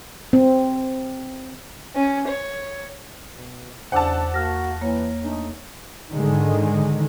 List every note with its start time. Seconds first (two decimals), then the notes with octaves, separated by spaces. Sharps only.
0.33 C4
1.96 C#4
2.27 C#5
3.36 B2
3.92 E2 C#3 D4 C5 F#5 A5 D6 E6
4.34 A#3 F#4 F6 A#6
4.81 E3 A#3 C#5
5.24 A3 D4 D#4
6.13 G#2 D3 D#3 G#3